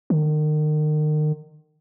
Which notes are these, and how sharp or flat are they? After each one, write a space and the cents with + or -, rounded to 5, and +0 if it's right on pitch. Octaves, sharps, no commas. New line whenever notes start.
D#3 -35